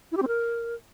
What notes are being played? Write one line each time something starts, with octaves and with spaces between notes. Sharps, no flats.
E4
G4
C4
A#4